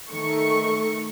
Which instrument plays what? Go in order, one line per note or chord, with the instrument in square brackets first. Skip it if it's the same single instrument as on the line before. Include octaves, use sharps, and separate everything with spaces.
[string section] D#3 A3 C#6